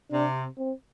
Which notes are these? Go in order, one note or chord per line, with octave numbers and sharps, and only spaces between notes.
C3 D4
C4